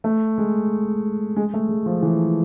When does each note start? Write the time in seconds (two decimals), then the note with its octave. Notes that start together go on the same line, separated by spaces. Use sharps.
0.04 A3
0.38 G#3
1.36 G#3
1.54 A3
1.69 G#3
1.86 F3
2.02 E3